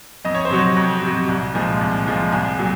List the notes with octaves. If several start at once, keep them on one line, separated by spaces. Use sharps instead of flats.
F2 D#5
C#5
C5
C3 F#3 C#5
F2
C3 F#3
C2
A#2 F3 G#3
C2
A#2 F3 G#3
C2 G#4
A#2 F#3